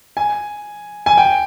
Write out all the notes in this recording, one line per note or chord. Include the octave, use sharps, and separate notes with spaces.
G#5
G#5
G5